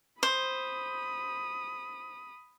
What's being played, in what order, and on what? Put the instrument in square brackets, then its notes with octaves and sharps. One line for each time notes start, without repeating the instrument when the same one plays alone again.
[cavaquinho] C5 [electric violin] B5 D#6